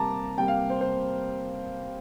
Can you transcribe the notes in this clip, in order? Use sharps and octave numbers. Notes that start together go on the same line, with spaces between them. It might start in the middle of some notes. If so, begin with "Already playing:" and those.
Already playing: C3 G3 A#3 A5 A#5 D6
C3 G3 A#3 G5
F5
C5
C5